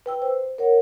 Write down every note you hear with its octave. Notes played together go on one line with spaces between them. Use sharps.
B4 G5 E6
C5
A#4 C#5 F#5